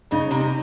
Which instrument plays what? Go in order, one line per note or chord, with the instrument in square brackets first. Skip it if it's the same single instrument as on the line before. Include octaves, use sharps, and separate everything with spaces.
[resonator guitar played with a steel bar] C#3 [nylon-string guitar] D#4
[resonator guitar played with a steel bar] C3